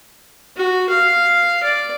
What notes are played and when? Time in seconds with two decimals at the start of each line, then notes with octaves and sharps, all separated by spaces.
0.57 F#4
0.90 F5
1.64 D5